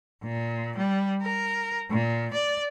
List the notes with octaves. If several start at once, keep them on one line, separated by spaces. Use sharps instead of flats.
A#2
G3
A#4
A#2
D5